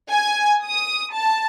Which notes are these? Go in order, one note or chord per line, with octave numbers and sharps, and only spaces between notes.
G#5
D#6
A5